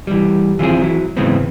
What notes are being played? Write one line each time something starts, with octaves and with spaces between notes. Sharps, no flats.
E3 G3
E3 F3 C4 G#4
F#3 E4
G#2 C#3 E3 G#3 B3 C4